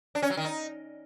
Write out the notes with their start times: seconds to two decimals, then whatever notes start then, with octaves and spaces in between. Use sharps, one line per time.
0.15 D4
0.22 C#4
0.30 F#3
0.37 D#3
0.45 D#4